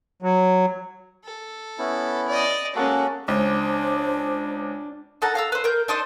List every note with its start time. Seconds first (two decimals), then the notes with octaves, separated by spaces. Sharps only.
0.22 F#3
1.25 A4
1.79 B3 C#4 E4
2.28 D5 D#5
2.76 G#3 A#3 C#4 F#4 A4
3.28 C#2 D4 C5
5.22 D#4 A4 F#5 A#5
5.35 F5 A#5 E6
5.52 B4 C5
5.64 A#4 G6
5.88 D4 D#4 C5 D#5